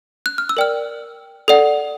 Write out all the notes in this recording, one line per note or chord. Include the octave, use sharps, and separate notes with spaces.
F#6
F6
E6
A#4 D5 G5 F6
A4 D5 F#5